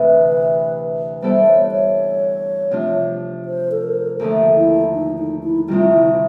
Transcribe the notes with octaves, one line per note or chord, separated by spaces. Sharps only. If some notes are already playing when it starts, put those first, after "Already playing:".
Already playing: D2 C3 E3 B4
G3 B3 E4 A4 C5 D5
C#5
C#5
C3 F3 A3 D4 F4
C5
A4
A#4
D#2 D3 F3 A3 A4
E4
D#4
D#4
E4
D2 C3 D#3 G3 F4
E4